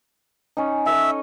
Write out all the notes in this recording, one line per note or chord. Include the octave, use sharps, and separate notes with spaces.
C#4 D#4
A4 C#5 D#5 E5